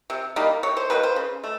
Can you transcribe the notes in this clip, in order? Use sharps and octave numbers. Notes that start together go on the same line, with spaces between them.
C3
D#3 G3 A#3
C3 C#5
C5
D#3 G3 A#3 B4
C5
C#3
A3